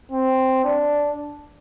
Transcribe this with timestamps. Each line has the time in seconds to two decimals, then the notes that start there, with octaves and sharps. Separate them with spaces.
0.12 C4
0.64 D4